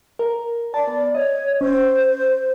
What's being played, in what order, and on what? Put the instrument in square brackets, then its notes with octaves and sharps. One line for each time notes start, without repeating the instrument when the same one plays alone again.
[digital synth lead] A#4
[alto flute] D5 [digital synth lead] A5
[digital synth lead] B3
[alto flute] C#5 [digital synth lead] D#5
[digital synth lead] C#4 [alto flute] C5